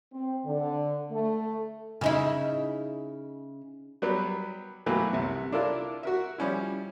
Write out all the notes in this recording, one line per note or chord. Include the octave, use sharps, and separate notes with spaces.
C4
D3
A3
C#3 D#4 E4
F#3 G3 B3
B2 E3 F#3 A3 A#3 G4
C2 C3
D4 E4 F4 A4 A#4 D5
F#4 A#4 E5
F3 G3 C#4 E4